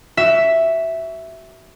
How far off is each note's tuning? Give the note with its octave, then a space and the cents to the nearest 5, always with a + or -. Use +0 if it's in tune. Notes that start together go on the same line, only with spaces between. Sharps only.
F#4 +30 E5 +0